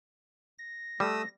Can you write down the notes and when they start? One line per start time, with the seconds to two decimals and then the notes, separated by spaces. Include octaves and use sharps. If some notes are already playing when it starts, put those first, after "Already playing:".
0.59 A#6
1.00 G3 A3 D#6 E6